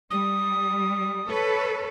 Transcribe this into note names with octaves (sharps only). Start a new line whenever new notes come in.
G3 D#6
A4 B4 C#5